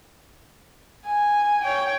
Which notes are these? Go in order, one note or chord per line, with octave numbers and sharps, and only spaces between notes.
G#5
C#5 G5